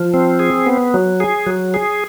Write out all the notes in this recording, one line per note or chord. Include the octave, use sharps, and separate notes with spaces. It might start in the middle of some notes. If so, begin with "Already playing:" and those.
Already playing: F3
C4
G#4
B3
F#3
G#4
F#3
G#4